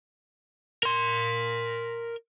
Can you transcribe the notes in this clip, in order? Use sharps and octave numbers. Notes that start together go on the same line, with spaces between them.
A#4 C6